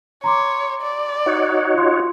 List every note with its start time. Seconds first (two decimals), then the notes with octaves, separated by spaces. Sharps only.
0.24 C#5 A#5 C6 D6
0.82 D5
1.26 D#4 F#4 C#5
1.74 F4 F5 C6